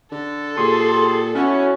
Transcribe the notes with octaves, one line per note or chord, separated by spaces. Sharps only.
D3 A4
A#2 G4 G#4 C6
B2 C#4 E4 F#4